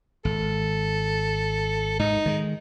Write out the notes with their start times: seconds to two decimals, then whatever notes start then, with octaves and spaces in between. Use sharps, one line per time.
0.25 G#1 A4
1.99 G#2 D#4
2.26 D#3 G#3